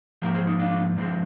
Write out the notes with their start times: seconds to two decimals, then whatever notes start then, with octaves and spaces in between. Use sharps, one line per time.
0.22 G#2 F3 A#3 G4 A#4
0.34 G#4 C5
0.47 D#4
0.59 D4 F4
0.96 G2 F3 G#3